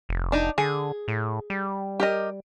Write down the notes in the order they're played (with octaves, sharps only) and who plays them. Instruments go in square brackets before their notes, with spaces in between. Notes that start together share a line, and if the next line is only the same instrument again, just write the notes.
[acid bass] F1
[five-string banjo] D4 D#4
[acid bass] D3 [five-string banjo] G#4
[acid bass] A2
G3
[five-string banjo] G4 A#4 D#5